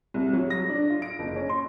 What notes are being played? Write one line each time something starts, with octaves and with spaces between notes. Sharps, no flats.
C2
F#3
A#6
D4
F4
D7
F#1
C#4
C6